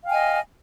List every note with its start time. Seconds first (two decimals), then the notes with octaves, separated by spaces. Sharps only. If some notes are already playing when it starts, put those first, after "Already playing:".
0.03 F5
0.06 G5
0.08 G#5
0.11 D#5